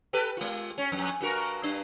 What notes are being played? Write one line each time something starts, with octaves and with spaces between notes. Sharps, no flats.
G4 A4 B4
G#3 F4
C#4
F2
G2 F#4 A#4
G2 D4